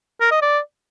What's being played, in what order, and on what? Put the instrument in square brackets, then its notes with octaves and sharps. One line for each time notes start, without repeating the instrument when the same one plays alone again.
[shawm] A#4
D#5
D5